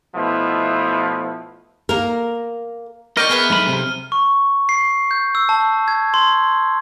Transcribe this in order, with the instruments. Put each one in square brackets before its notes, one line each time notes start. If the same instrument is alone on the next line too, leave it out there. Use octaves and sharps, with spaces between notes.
[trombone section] B2 F3 A3 B3 E4
[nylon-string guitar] A#3 A#4
[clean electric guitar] A#4 [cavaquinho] D5 G5 C#6 [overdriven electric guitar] D#5 [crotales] F6 D#7
[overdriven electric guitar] B3 [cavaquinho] G#4 B4 E5
[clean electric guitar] G#2 B5 [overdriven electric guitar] F#3 A4
[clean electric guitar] C3
[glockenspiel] C#6
C7
G6
E6
A5
G#6
C6